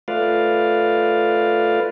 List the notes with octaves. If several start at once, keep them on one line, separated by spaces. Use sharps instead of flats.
A3 F4 B4 D5 F5